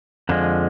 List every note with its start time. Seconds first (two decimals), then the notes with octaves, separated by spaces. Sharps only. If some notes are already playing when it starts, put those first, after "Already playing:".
0.29 F2 D3 F3 G#3